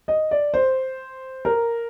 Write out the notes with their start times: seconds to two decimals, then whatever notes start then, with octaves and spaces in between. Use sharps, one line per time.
0.08 D#5
0.31 D5
0.54 C5
1.45 A#4